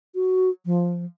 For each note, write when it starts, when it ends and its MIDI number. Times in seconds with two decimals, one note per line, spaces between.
0.15 0.50 66
0.66 1.05 53